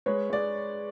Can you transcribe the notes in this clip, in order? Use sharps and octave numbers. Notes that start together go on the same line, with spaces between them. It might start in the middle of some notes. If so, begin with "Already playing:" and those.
G#3 B4 C#5
G#3 D5